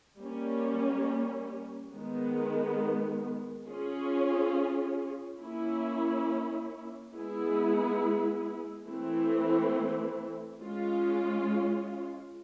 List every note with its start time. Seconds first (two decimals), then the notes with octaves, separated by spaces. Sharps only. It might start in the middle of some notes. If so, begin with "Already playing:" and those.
0.19 G3 A#3 C#4
1.93 D#3 G#3 B3
3.66 C#4 F4 G#4
5.40 A#3 C#4 E4
7.14 G#3 B3 E4 G#4
8.87 E3 A3 C4 E4
10.61 G#3 C#4 F4